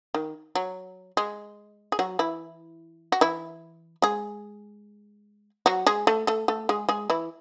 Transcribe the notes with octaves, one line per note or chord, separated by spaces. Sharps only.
D#3
F#3
G#3
G#4
F#3 F#4
E3 E4
F#4
E3 E4
G#3 G#4
F#3 F#4
G#3 G#4
A3 A4
A3 A4
A3 A4
G#3 G#4
G#3 G#4
E3 E4